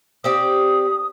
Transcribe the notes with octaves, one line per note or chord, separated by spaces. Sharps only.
C4 G4 D5 D#6